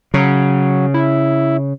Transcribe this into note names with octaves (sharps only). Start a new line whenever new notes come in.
C#3 F#3
E4